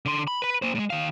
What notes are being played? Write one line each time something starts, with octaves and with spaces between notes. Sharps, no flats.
D3 C6
B5
B4 B5
A#3 C5
A2 G#3
D#3 F5